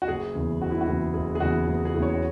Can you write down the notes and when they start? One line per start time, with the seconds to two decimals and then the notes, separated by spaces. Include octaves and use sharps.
0.02 F#4
0.08 F#1 G#4
0.35 E2 C#3 E3
0.61 F#1 F#4
0.71 E4
0.81 F#4
0.87 E2 C#3 E3
1.14 F#1 G#4
1.35 G#4
1.40 E2 C#3 E3 F#4
1.67 F#1 G#4
1.85 G#4
1.94 E2 C#3 E3
2.03 C#5
2.14 F#4